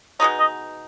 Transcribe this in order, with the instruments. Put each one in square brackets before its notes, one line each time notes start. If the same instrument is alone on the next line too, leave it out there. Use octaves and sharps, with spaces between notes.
[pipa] B2 G#3 B3 D#4 [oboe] D#5
[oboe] D#5